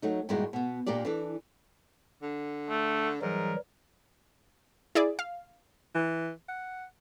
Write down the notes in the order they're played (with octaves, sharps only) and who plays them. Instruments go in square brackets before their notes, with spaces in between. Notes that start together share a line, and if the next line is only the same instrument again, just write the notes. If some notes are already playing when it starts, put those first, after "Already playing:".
[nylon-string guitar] F#3 A3 D#4
G2 A#2 D#3 G#3 E4 F#4
B2 B3
A#2 A#3 D4 G4 D5
E3 D4 A4
[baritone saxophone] D3
[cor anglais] A3
[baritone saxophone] G#2 [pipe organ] E3 F#3 G3 [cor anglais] A#4
[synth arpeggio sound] E4 G#4 D5
F5
[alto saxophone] E3
F#5